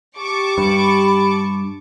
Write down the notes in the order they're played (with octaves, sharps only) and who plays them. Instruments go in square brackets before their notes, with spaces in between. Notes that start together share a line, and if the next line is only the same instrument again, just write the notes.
[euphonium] G4 [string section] A5 C#6 D6
[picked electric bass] G2 [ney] B5